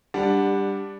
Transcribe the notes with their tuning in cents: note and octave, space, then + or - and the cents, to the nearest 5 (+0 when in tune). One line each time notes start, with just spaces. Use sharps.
G3 +15 D4 +0 F#5 +0